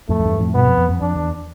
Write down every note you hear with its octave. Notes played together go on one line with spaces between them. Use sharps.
F2 A2 A3
F2
E2 G2
F2 A2
G2 B2 B3
F2
F2
F2
F2 D4
E2